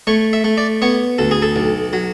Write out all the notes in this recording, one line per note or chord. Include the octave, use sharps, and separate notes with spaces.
A3 C#5
E5
A3
D5
B3 C#5
D2 A4
G#4
A4
B1
F#3